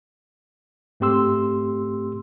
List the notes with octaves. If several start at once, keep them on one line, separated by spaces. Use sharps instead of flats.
G#2 A3 C4 G4 C6 E6